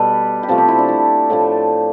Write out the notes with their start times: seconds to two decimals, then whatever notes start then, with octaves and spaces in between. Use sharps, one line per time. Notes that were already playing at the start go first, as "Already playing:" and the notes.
Already playing: B2 G3 A4 B4
0.43 G4
0.48 C3 F3 A3 A4
0.58 G4
0.68 E4
0.79 D4
0.89 E4
1.30 A2 F3 A3